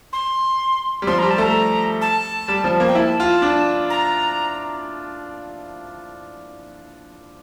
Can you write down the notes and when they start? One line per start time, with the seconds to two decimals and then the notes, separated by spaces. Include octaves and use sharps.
0.13 C6
1.02 G3
1.07 F3 C6
1.19 G3 A#5
1.30 A5
1.38 A3 A#5
2.01 A5
2.48 G3
2.64 F3
2.80 A#3
2.88 G5
2.95 E4 A5
3.20 F4
3.42 D4
3.90 A#5